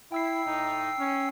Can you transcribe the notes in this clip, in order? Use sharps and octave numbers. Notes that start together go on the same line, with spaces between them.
E4 G5 E6 C7
A2 D#4
C#4